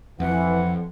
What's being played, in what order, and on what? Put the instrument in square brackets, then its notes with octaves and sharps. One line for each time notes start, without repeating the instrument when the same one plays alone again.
[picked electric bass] F2 [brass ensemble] E3 [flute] F#5